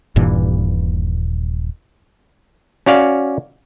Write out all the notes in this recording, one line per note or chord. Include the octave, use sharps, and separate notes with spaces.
D#1 G2 A#2 E3
C#4 F#4 D5 F5